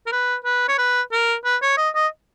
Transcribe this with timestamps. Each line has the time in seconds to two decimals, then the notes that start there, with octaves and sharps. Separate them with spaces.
0.06 A#4
0.12 B4
0.45 B4
0.68 C#5
0.78 B4
1.12 A#4
1.45 B4
1.62 C#5
1.77 D#5
1.95 D#5